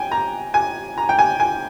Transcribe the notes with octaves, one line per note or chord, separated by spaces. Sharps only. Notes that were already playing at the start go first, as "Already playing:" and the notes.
Already playing: G5 G#5
A#5
G#5
A#5
G5
G#5
G#5